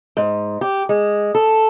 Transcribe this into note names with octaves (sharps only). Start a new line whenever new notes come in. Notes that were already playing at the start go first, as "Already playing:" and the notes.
G#2
G4
G#3
A4